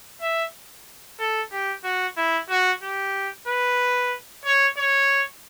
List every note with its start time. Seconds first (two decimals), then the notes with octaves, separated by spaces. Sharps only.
0.22 E5
1.19 A4
1.51 G4
1.84 F#4
2.17 E4
2.49 F#4
2.83 G4
3.48 B4
4.45 C#5
4.77 C#5